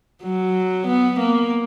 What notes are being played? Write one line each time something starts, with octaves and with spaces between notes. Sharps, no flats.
F#3
B3
A#3